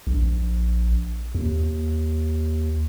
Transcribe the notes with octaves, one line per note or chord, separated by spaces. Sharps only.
A#1
D#2